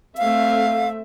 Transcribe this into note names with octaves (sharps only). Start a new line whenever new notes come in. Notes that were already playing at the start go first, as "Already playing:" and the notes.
A3 C4 E5 F5